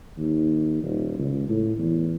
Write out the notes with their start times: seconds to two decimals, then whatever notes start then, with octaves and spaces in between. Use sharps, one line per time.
0.17 D#2
0.83 D#1
1.18 C#2
1.49 A2
1.78 E2